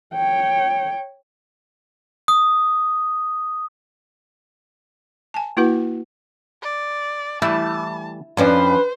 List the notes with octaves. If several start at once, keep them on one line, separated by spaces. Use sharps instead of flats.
C#5 G5
D#6
G#5 A5
A#3 E4 F#4 B4 F#5
D5
E3 G3 A3 E4 A5
F2 F3 C#4 D4 B4 C5